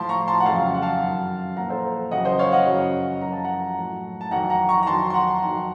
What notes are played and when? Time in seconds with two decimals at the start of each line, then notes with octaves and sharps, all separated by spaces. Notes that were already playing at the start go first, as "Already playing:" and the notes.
Already playing: A2 F3 A5 C6
0.09 A#5 C#6
0.28 A5 C6
0.40 F#5
0.46 F2 C#3 F#3 F5 A5
0.75 F#5
0.82 F5 A5
1.01 F#2 D#3 F#3
1.56 A#2 F3 F#5 A#5
1.70 A4 C5
2.11 F2 C#3 F#3 D#5 F#5
2.25 C5 D#5
2.39 C#5 F5
2.52 D#5 F#5
2.66 F#2 C#3 F#3
3.21 F#2 F3 A#5
3.33 A5
3.44 F#5 A#5
3.76 A2 F#3
4.21 A5
4.31 F2 D#3 F#3 F#5 A#5
4.50 F#5 A#5
4.69 A#5 C#6
4.83 A#5
4.86 F2 D#3 F#3 A5 C6
5.10 C6
5.14 F#5 A#5
5.42 F2 D#3 F#3